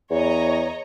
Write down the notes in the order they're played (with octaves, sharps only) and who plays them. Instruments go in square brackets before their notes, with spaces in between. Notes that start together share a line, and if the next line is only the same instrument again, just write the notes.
[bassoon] E2 [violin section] C#5 D#5 A#5